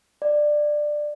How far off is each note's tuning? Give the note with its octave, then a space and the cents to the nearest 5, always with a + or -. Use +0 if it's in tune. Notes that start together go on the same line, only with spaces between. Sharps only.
D5 +15